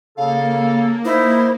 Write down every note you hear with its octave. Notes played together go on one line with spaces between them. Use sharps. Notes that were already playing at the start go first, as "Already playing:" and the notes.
C#3 A#3 A4 F5
D#4 E4 C5